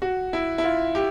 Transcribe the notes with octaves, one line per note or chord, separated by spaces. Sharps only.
F#4
E4
E4
F4
G4